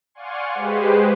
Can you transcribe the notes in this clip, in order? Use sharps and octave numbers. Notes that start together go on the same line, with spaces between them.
D5 F5 F#5 G#5 C6 C#6
G#3 G4 G#4 B4 C5